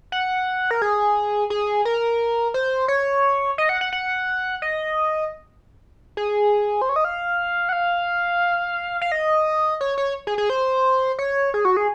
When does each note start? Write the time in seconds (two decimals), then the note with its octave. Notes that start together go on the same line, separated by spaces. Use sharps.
0.12 F#5
0.71 A#4
0.82 G#4
1.50 G#4
1.85 A#4
2.54 C5
2.88 C#5
3.58 D#5
3.69 F#5
3.81 F#5
3.93 F#5
4.62 D#5
6.17 G#4
6.82 C5
6.89 C#5
6.96 D#5
7.04 F5
7.69 F#5
7.73 F5
9.01 F5
9.12 D#5
9.81 C#5
9.98 C#5
10.27 G#4
10.38 G#4
10.50 C5
11.19 C#5
11.54 G#4
11.65 F#4
11.77 G#4